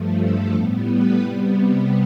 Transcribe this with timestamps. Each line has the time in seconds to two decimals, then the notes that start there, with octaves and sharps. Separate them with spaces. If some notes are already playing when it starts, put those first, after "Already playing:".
Already playing: G2 F3 A3
0.17 A3 A4
0.52 A2 G3 B3
0.87 B3 B4
1.22 C3 G3 B3